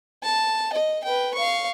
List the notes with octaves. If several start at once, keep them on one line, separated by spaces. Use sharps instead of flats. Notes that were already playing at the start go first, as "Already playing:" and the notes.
A5
D#5
B4 G5
F5 C#6